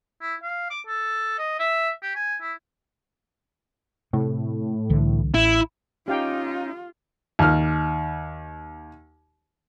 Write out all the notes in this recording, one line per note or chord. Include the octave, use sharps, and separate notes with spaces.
E4
F5
D6
A4
D#5
E5
G4
G#5
E4
A2 C3
C2 D3 E3
A1 E4
C#4 D#4 F4 G4 F5 G5
D#2 F6